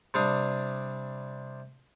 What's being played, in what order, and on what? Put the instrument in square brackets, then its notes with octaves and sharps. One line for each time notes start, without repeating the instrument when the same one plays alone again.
[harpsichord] C3 G3 D4 F5 D#6